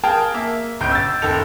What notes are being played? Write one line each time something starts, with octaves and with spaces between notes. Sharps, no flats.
G#4 A#4 F5 G5 A5
A#3 E5
G1 C#2 G6 D7
E6 A6
F#1 D#3 A4 F7